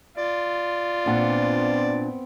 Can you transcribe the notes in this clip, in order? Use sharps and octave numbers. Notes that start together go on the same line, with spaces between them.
F4 D5
A#2 B3 C4 D4 F#5